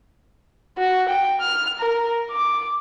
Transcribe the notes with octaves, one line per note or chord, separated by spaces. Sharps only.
F#4
G5
F6
A#4
D6